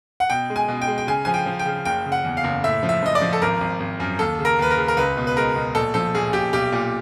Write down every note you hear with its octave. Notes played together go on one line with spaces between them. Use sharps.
F#5
B2 G5
G#3
G#5
B2
G5
G#3
G5
C#3 G#5
F3 G#5
G5
F3
G5
C#3
F#1 G5
C#3
F#5
E2
F5
F#1
A2 E5
F3
E5
F3 D#5
D5
F3
A4
G#1 A#4
G#1
G#1
F#2
D#2 A4
C#3
A#4
D#2 B4
A#4
C#3
A#4
C#2 B4
B2
B4
G#3 A#4
B2
A#1 A4
F3 A4
A#1 G#4
A#1 G4
B1 G4
A#2